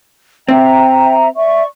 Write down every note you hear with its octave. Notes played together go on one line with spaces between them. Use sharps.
C4 E5 G5 A#5
D5 E5 C#6